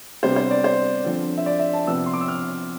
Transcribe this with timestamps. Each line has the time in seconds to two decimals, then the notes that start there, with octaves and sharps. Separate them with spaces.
0.23 C3 G3 B3 D4 C5
0.36 C5
0.51 D5
0.64 C5
1.05 D3 F3 C4
1.37 E5
1.46 D5
1.59 E5
1.73 A5
1.87 C3 F3 B3 E6
2.06 C6
2.14 D6
2.21 E6
2.28 F6